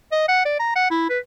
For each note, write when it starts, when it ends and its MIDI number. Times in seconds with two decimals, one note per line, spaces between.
0.12 0.24 75
0.28 0.44 78
0.45 0.59 74
0.59 0.74 82
0.75 0.89 78
0.90 1.08 64
1.09 1.19 71